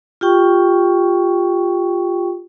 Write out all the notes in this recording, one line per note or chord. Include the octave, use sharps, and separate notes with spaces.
F4 G4 G5 C#6